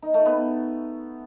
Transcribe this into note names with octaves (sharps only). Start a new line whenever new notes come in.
D#4
A3
B3